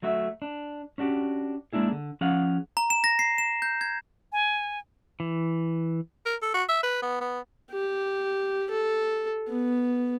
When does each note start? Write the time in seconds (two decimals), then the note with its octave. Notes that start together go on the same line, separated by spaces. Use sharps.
0.02 F#3 A3 F#4 E5
0.42 D4
0.98 C#4 D4 F#4 G4
1.73 G#3 A#3 D4 E4 G#4
1.92 D3
2.21 F3 C#4 G#4 F5 F#5
2.77 A#5
2.90 E7
3.04 A#6
3.19 C7
3.38 E7
3.62 G6
3.81 G#6
4.32 G#5
5.20 E3
6.26 A#4
6.42 A4
6.54 F#4
6.69 E5
6.83 B4
7.02 B3
7.21 B3
7.72 G4
8.70 A4
9.48 B3